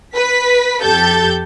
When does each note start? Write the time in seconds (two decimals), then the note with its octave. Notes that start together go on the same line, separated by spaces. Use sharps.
0.15 B4 B6
0.83 F2 G4 A4 G6 A6